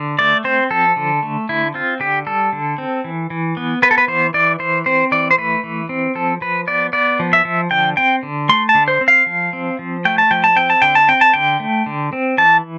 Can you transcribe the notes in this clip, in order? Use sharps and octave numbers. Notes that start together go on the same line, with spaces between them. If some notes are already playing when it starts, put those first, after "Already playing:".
Already playing: D3
A3 D5
C4 C5
F3 A4
D3
A3
D3 E4
C4 F4
D3 G4
G3 A4
D3
C4
E3
E3
B3
B3 B4
A4
B4
E3 C5
E3 D5
E3 C5
C4 C5
E3 D5
C5
A3 B4
E3
C4
F3 A4
F3 B4
B3 D5
B3 D5
F3
E5
F3
D3 G5
C4 G5
D3
A3 C6
A5
D3
C5
C4
F5
F3
C4
F3
A3 G5
A5
F3 G5
A5
C4 G5
A5
D3 G5
A5
C4 G5
A5
D3 G5
A3
D3
C4
E3 A5